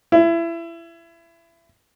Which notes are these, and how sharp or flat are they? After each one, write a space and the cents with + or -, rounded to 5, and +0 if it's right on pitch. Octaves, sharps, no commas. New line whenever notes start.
E4 +25